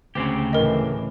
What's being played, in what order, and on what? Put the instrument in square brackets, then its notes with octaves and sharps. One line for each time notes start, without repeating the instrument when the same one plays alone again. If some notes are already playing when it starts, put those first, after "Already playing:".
[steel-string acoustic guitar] D2 [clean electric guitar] C#3 C4 G4
[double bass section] A2 E3 [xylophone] A#4 D#5